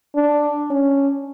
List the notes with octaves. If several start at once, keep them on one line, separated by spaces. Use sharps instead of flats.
D4
C#4